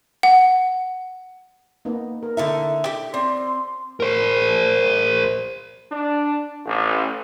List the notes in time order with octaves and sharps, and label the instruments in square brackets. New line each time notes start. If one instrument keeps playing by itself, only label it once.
[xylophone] F#5
[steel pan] A#3 B3 D#4
A#4
[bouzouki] D3 D#4 E5 [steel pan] E4 A4
[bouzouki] G4
[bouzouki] C4 [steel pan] D5 [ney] C6
[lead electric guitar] A#4 C5
[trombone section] D4
A1